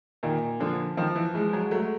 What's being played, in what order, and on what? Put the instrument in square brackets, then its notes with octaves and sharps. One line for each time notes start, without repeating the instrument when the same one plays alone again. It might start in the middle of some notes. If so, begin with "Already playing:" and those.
[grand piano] A#2 [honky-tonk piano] D#3
[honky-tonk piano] D3 [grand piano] F3
[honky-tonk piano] D#3 [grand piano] F3
[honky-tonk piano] E3
[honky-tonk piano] E3 [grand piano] G#3
[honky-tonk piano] F#3
[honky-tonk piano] F#3 [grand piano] A3